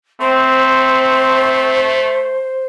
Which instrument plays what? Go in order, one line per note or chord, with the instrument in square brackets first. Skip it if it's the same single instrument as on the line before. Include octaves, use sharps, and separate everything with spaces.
[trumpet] A3 [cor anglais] C4 [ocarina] C5